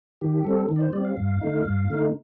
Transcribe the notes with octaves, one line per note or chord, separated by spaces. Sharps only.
D#3 G4
G3 C4 A4
D#3
D5
C5
G3 C4 D5
F5
G2
D3 A3 D#4
G2
D3 A3 D#4